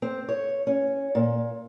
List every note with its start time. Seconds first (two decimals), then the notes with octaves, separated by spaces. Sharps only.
0.02 C4
0.29 C#5
0.67 C#4
1.15 A#2